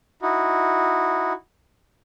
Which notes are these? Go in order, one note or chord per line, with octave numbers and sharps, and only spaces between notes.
D#4 E4 F#4